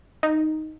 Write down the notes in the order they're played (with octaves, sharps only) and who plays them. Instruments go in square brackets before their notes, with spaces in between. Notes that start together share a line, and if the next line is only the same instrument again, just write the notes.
[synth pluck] D#4